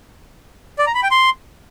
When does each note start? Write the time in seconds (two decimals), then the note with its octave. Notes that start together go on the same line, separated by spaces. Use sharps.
0.79 D5
0.87 A#5
0.95 B5
1.03 G5
1.11 C6